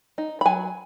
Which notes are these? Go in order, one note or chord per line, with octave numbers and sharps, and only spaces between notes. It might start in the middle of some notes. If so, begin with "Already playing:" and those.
D#4
B5
F#3 G#5